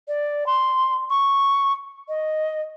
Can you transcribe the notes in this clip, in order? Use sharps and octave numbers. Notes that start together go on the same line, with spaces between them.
D5
C6
C#6
D#5